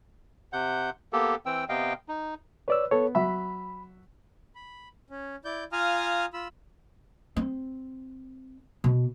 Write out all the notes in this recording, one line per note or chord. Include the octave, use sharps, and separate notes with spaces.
C3 F#5 G6
A#3 B3 G4 A4
E3 C4 G5 E6
C3 B3 D#5 F5 G5
D#4
B4 C#5 D5 E6
B3 A4 C#5
F#3 E5 B5
B5
C#4
E4 D5 G6
F4 F5 G#5 A#5 D#6 F6
F4 B5 E6
C4
B2